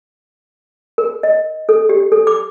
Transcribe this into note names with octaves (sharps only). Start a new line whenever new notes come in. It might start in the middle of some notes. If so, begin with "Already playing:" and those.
A#4
D#5
A4
G4
A4
D6